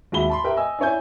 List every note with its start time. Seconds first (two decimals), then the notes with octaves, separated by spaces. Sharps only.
0.12 D#2 G#3 F#4 E5 B5 G7
0.30 A5 B5 C6
0.44 G4 A#4 B4 E5 G5
0.56 D#5 G#5 E6
0.79 D4 E4 C#5 G#5 G6